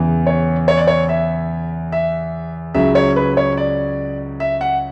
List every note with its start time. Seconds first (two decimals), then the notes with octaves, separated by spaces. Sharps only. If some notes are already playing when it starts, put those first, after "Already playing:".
Already playing: E2 C#3 E3
0.27 C#5
0.68 C#5
0.77 D5
0.87 C#5
1.09 E5
1.92 E5
2.74 C#2 C#3 F#3 E5
2.95 C#5
3.16 B4
3.37 C#5
3.57 D5
4.40 E5
4.61 F#5